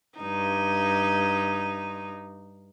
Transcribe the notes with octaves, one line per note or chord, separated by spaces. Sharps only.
G2 D#4